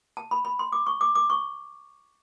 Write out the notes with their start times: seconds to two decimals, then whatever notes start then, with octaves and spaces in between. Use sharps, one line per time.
0.17 A5
0.31 B5
0.45 B5
0.59 C6
0.72 D6
0.87 C#6
1.01 D6
1.15 D6
1.30 C#6